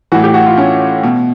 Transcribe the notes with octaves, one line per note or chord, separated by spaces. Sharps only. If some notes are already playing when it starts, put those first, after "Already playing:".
A2 E3 F#4
G4
F#4
F4
C#4
B2